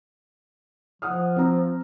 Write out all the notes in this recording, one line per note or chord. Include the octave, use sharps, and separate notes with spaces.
F3 F#5 D#6 F6
C4 A#5